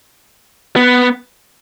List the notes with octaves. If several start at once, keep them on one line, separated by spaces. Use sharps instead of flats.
B3